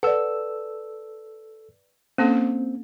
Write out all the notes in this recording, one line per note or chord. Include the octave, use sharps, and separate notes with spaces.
A4 B4 D5 F#5 E6
A#3 C4 C#4 A4